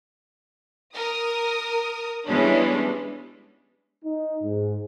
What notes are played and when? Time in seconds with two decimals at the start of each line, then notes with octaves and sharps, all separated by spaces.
0.94 A#4 D#6
2.26 E3 G3 G#3 B3 C#4 D4
4.03 D#4
4.42 G#2